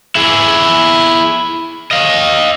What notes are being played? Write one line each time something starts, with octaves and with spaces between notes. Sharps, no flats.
E4 G#4
D#5 F5